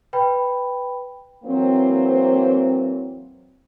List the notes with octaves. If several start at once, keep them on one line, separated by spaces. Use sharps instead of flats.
B4 G5 B5
E3 F#3 A#3 C4